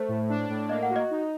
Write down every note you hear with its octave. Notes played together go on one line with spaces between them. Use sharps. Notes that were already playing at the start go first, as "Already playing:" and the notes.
Already playing: A3 C5
A2
D4
A2
A#3 D#5
F#5
F#4
D#5
D#4